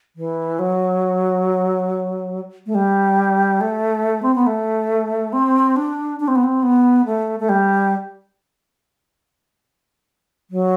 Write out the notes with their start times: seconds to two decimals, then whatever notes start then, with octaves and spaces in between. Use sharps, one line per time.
0.16 E3
0.59 F#3
2.66 A3
2.75 G3
3.61 A3
4.23 C4
4.35 B3
4.47 A3
5.33 C4
5.76 D4
6.20 D4
6.28 C4
6.36 B3
6.44 C4
6.63 B3
7.05 A3
7.40 A3
7.49 G3
10.50 F#3